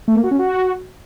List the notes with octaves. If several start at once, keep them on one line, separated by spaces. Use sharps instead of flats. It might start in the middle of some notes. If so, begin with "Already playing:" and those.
A3
A#3
F#4
C#4
F#4